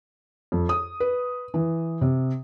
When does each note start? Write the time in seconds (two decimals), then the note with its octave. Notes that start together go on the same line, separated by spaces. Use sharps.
0.52 F2
0.69 D#6
1.00 B4
1.54 E3
2.01 C3